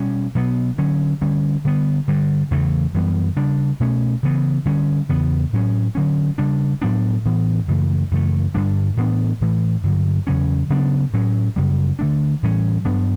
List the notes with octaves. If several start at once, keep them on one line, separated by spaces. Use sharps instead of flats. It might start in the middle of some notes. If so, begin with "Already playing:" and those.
Already playing: B2 G3 C#4
B2 F#3 B3
D3 F#3 C#4
D3 G3 C#4
D3 G3 B3
G2 D3 G3
E2 C#3 E3 A3
F#2 E3 G3 B3
C#3 G3 D4
B2 A3 C#4
C#3 E3 B3
D3 G3 C#4
E2 C#3 E3 B3
A2 F#3 C#4
D3 F#3 C#4
C#3 G3 D4
A2 F#3 B3 D4
A2 E3 B3
F#2 C#3 E3 A3
F#2 C#3 E3 A3
G2 D3 G3 D4
A2 E3 B3 D4
A2 E3 A3
G2 D3 F#3
E2 C#3 F#3 C#4
C#3 F#3 B3 D4
A2 F#3 C#4
F#2 C#3 G3
D3 A3 D4
A2 E3 G3 C#4
G2 F#3 B3 D4